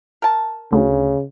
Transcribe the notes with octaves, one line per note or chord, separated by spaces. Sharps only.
A#4 A5
D2 C#3